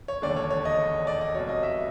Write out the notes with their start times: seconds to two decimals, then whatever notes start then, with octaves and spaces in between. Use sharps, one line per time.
0.08 C#5
0.22 E1 D#2 D3 D5
0.37 C#5
0.51 C#5
0.65 D#5
1.07 D5
1.21 D#5
1.34 C2 B2 C#5
1.49 D#5
1.63 E5